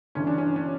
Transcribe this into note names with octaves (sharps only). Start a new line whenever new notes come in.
G1 G2 E3 C#4
D4
C#4
C#4